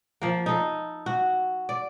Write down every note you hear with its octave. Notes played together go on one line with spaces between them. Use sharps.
F3 A#3
D#4 A4
F#4
D5